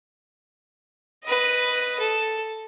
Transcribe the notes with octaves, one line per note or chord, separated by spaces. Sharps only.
B4 D#5
A4